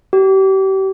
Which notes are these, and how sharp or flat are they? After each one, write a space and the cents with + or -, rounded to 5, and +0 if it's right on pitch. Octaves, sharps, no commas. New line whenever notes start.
G4 -35